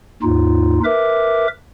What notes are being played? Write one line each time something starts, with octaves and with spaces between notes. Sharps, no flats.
D#2 G#2 D#4 F4
A#4 B4 E5 D6